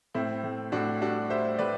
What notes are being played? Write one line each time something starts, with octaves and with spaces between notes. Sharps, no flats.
A2 C4 E4
A2
A2 D4 F#4
G3 D4 F#4
G3 C5 E5
A2 B4 D5